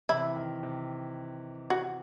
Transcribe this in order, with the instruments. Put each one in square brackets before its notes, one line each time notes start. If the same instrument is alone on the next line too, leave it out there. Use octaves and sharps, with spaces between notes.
[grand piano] C3 E3 [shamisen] E4
[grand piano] D#3
C3
[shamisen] F#4